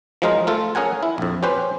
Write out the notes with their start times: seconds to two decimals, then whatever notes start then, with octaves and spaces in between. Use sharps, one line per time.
0.22 F3 F#3 G#3 D#4 F4 A#4
0.47 A3 F4 A4
0.75 C#4 G#4 A#4 F#5 G#5
1.03 E4
1.18 A#1 F2
1.43 C#4 G4 B4 C5